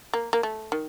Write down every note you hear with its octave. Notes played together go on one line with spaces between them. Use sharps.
A#3
A#3
A3
D#3